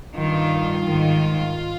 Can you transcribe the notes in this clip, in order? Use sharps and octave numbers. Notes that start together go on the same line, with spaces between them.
G2 D#3 F4
G#2 D#3